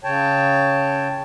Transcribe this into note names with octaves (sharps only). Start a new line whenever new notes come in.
C#3 C#5 G5 A5